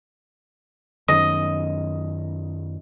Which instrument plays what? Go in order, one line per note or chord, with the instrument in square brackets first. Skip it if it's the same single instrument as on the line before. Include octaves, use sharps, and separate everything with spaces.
[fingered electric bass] F#2 D#3 C#4 [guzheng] D#5